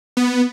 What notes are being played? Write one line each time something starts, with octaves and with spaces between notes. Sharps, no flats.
B3